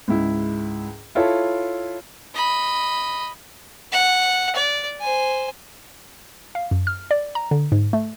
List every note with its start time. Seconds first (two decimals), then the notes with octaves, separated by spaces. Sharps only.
0.08 C#2 G#2 E4
1.15 E4 F4 A4 C#5 E5 A5
2.35 D#5 B5
3.92 F#5
4.55 D5
5.01 C5 G#5
6.55 F5
6.71 F#2
6.87 F6
7.11 D5
7.35 A#5
7.51 D3
7.72 G#2
7.93 A3